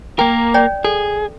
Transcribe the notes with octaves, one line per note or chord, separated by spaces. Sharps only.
A#3 A#4 G5
C#5 D5 G5
G#4 A4